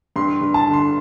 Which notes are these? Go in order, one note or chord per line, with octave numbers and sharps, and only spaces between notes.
G2 C6
G2
A5
D3
C6